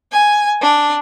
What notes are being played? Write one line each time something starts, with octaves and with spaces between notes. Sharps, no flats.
G#5
D4